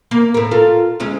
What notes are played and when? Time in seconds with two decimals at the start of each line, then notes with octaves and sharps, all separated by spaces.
0.11 A#3
0.34 A2 A#4
0.51 F4 A4 A#4
1.00 D2 G#3 C#4